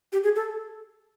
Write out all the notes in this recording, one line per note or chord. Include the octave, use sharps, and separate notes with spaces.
G4
G#4
A4